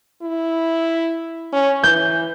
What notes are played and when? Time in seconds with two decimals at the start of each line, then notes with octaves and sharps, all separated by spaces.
0.22 E4
1.53 C#4
1.83 E3 G6